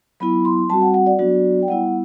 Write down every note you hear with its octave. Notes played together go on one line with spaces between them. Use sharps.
F#3 B3 E4 B5
C6
G3 C4 F#4 A5
F#5
F#5
D5
F#3 B3 D4 F#4
G5
G3 B3 E4 F#5